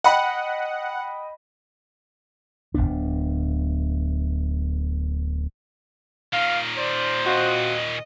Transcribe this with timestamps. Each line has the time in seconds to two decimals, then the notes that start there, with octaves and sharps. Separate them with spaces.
0.04 D#5 F#5 G5 B5
2.74 D1 G1 B3 D4
6.33 A#2 D#3 F5
6.77 C5 D5
7.25 C4 F4 F#4 D#5